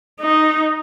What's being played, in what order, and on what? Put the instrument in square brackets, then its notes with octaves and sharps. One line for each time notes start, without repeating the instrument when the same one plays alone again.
[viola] D#4